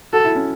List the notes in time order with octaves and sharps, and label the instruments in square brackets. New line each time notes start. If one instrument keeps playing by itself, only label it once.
[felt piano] F#4 [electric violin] A4
[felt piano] E4
C#4